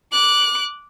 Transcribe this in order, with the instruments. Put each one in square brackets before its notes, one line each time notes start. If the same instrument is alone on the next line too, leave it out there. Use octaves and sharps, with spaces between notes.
[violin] D6 F#6